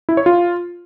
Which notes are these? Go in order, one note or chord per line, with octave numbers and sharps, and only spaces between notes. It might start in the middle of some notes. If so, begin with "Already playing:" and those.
E4
C#5
F4